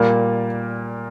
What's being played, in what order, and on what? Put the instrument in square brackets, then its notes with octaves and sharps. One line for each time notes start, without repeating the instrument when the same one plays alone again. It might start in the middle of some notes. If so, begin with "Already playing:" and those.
Already playing: [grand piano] A#2 G3 A#3